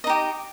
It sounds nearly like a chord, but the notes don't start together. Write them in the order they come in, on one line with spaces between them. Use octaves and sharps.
D#5 D#4 G4